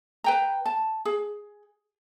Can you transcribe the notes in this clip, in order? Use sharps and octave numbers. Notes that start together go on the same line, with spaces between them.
B4 G5 A#5
A5
G#4